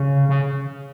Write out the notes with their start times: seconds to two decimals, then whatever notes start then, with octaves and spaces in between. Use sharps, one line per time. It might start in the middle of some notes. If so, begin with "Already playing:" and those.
Already playing: C#3
0.29 C#3